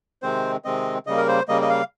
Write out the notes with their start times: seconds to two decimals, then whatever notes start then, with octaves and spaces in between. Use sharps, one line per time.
0.22 C3 D#3 G#3 C4 C5
0.65 C3 D#3 G#3 C4 D#5
1.07 C#3 G3 A#3 D#5
1.17 A#4
1.28 C5
1.48 C#3 G3 A#3 D#5
1.62 D#5
1.69 F5